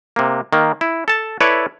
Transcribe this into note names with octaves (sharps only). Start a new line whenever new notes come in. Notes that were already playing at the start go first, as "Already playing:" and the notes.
C3 A#3
D#3 A#3
E4
A4 A5
E4 A4 B4 C#5 D5